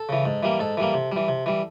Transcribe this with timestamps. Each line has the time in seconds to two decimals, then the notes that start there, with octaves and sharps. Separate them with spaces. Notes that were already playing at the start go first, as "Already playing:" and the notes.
Already playing: A4
0.09 C#3 E3
0.25 G#2
0.43 E3 G3 A#3
0.59 G#2 A4
0.77 E3 G3 A#3
0.94 C3
1.12 E3 G3
1.28 C3
1.46 E3 G3